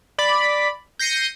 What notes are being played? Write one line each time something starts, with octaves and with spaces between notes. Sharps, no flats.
D5 B5
G6 A#6 C7 C#7 D#7